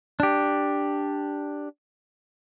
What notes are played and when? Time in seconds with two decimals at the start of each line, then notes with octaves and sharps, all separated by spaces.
0.20 D4 G4